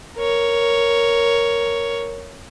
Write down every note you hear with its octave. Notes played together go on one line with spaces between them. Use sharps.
A#4 C#5